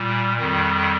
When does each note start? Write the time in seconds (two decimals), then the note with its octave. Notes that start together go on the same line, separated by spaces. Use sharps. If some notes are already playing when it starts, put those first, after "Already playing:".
Already playing: A#2 G3
0.37 F2 D#3 G3